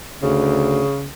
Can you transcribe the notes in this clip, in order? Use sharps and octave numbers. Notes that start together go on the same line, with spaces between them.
D2 C#3